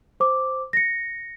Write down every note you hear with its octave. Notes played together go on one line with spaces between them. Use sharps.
C5 D6
A#6 C#7